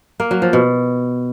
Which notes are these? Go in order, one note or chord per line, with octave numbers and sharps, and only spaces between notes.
A#3
F#3
F3
B2